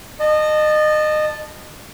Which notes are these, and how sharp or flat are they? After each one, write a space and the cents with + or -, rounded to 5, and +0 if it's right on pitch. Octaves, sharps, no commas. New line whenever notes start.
D#5 -25 A5 +0